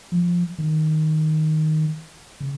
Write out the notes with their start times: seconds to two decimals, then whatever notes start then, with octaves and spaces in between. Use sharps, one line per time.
0.12 F3
0.58 D#3
2.40 C#3